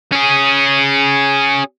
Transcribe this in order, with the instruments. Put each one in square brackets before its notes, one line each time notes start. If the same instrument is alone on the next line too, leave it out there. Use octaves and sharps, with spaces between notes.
[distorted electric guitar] C#4 G#4